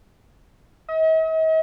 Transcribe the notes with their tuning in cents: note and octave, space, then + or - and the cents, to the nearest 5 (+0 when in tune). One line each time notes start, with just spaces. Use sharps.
D#5 +45